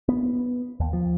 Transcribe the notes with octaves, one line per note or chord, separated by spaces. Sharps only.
B3
D#2
F3